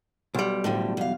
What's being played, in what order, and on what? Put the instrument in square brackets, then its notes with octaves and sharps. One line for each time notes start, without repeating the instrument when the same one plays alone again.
[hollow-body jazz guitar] B1 G3
[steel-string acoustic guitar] A2 D3 F3
E2 F5